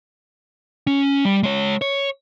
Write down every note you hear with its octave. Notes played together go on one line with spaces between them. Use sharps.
C#4
G3
G#3 C#5
C#5